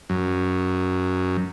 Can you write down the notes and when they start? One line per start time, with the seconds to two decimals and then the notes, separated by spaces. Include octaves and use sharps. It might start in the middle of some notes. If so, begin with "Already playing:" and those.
0.09 F#2